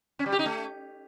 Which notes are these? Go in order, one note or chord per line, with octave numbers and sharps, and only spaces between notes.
C#4
G3
G4
D#4
A3